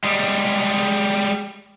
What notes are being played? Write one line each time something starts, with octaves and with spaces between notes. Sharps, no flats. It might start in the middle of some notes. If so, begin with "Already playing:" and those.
G3 G#3